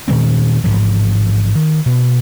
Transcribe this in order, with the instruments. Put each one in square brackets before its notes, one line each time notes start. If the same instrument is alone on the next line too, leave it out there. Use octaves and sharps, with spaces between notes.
[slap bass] A#2 D#3 G#3 C4
A1 G#2 C#3 F3
D#3
B2